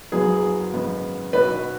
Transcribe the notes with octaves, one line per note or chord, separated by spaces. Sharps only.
F#1 F#2 F#3 B3 G#4
G#1 F#2 C#3 B3
B1 B2 B3 F#4 B4